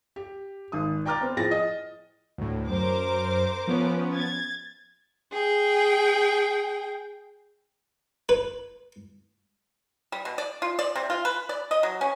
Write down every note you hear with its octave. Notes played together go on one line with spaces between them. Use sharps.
G4
G#1 D#6
D5 G5 A#5 D6 F6 A6
B3 C4
A2 F3 G#4 G5 A6 A#6
D#5
D2 A2
F#2 A#4 C5 D6
F3 B3 C#4
G#6 A6
G#4 G5
B4
G3
B2
D5
F4
D5
C3
F4
B4
D5
D#5
F#3
C#4